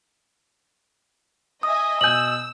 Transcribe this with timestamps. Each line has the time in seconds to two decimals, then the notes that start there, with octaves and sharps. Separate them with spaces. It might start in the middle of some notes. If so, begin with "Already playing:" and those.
1.63 D#5 E5 G#5 D#6
2.01 B2 G#5 E6 G6 F#7